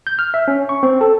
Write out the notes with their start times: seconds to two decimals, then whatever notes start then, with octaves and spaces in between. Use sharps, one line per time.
0.07 G6
0.19 F6
0.34 E5
0.48 C#4
0.69 C#6
0.83 C4
1.01 A4